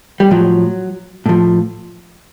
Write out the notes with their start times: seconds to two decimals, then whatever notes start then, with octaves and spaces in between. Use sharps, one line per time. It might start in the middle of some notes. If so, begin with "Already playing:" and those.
0.20 G3
0.31 A2 F3 F#3
1.26 A2 F3